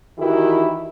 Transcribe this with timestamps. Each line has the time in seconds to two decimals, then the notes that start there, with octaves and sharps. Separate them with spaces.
0.18 D#3 E3 E4 F#4 G4